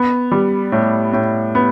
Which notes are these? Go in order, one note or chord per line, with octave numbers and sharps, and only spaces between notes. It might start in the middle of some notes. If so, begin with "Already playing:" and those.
Already playing: B3
G3
A2
A2
B3